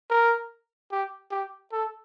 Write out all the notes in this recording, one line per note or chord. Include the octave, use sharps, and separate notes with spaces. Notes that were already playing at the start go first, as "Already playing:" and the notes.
A#4
G4
G4
A4